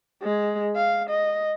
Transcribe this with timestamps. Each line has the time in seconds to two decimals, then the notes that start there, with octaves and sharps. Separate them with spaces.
0.22 G#3
0.76 F5
1.10 D#5